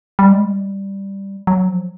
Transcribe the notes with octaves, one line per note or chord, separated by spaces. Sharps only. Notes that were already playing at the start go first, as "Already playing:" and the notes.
G3
G#3
G3
F#3
F3